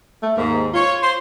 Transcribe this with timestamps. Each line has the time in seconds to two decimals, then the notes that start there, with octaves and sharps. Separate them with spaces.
0.23 A3
0.38 D#2 G#2 A#3
0.74 F4 C#5
1.02 C5